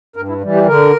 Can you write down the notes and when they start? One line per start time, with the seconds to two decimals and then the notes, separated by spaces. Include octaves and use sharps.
0.16 G2 A#4
0.28 E4
0.41 E3 G3
0.55 G4
0.67 D3 A#4